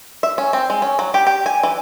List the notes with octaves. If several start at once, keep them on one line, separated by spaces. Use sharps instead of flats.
E5
C#4
C4
G#3
C#4
F#3
G4
G4
G#5
E3